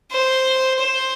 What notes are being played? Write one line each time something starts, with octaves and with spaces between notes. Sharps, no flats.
C5
C5